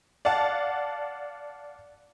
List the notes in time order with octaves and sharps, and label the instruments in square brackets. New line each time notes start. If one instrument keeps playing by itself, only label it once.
[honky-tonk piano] D5 F5 F#5 A5